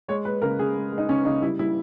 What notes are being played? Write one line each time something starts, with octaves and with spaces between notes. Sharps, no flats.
G#3 C#5
G#3 B4
C#3 A#4
C#3 G#4
G#3
G#3
D#4
C#3 C#4
C#3 D#4
G3 E4
G3 E4